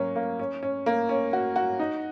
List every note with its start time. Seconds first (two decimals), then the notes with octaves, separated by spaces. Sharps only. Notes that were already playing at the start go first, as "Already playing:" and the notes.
Already playing: F#3 A#3 C#4
0.16 A#3
0.39 C#4
0.63 C#4
0.86 A#3
1.09 C#4
1.33 F#4
1.56 F#4
1.79 D#4